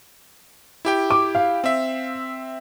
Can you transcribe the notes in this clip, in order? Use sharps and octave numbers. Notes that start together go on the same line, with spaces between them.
E4 G4 G5
D6
F5
C4 E5